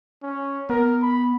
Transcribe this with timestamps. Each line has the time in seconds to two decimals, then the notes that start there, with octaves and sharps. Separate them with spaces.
0.23 C#4
0.70 B3 A#4
1.02 B5